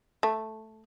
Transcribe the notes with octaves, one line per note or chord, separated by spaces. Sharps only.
A3